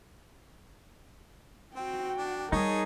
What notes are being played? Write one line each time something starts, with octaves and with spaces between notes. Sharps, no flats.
C4 F#4 G5
D4
G3 D#4 G#4 A#4 C#5 D#5 A5